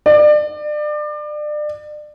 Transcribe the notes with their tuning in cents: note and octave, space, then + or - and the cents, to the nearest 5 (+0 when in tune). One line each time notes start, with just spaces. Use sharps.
D5 +30